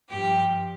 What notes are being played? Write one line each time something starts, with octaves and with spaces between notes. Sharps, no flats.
G2 F3 G4 G5